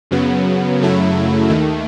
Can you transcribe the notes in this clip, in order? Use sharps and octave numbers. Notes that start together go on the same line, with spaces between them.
F#2 C#3 F#3 B3
F#2 C#3 F#3 A3 E4
D#2 D#3 A3